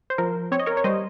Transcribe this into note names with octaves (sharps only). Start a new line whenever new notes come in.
C5
F3 A#4
C4 C#5
D#5
A#4 C#5
C#5
G3 C5 D#5